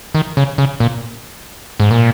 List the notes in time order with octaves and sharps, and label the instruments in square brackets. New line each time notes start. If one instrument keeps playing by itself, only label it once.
[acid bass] D#3
C#3
C#3
A#2
G#2
A#2